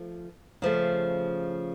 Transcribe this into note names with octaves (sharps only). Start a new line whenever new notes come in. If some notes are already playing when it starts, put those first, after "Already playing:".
Already playing: F3 A3
C#3 F3 A3